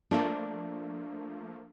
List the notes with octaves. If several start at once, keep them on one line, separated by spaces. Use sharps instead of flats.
F3 A3 A#3 D4